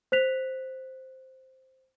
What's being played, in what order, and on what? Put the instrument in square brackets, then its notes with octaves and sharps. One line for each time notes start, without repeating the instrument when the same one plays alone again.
[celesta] C5 F#6 B6 F7